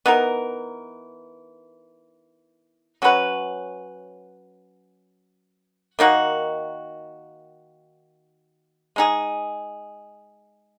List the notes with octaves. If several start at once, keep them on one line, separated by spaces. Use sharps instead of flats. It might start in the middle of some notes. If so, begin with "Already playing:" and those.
E3 B3 D#4 A#4
F#3 C#4 F#4 B4
D#3 A#3 D#4 F#4
G#3 D#4 G#4